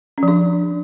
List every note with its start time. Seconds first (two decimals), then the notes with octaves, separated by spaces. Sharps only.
0.18 C#4
0.23 F3
0.28 D4